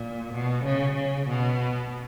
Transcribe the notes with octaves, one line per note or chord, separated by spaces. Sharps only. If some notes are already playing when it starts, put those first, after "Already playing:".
Already playing: A#2
B2
C#3
C#3
B2